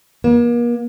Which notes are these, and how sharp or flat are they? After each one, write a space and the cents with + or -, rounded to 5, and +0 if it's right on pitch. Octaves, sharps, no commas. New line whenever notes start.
A#3 +40